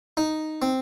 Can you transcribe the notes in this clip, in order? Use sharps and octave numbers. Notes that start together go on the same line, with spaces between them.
D#4
C4